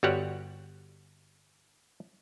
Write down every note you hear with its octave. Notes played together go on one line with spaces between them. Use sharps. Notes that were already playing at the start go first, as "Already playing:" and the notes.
G1 G3 F#4 G4 C#5 F#5